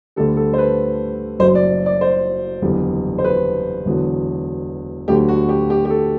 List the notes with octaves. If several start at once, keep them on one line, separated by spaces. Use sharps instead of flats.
D2 D3 G3 A4
A4
C5
B4
F#1 F#2 F#3 C5
D5
D5
C5
F#1 E2 D3 G3
C5
B4
E1 E2 D3 F#3
D2 D3 F#3 G4
F#4
G4
G4
G4
A4